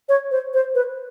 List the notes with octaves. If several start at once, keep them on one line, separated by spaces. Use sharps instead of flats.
C#5
C5
C5
B4